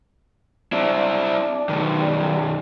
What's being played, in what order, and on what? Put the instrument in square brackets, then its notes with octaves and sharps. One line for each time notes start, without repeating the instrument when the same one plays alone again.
[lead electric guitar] C4 E4 [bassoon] D4
[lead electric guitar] B1 D#3
[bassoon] G3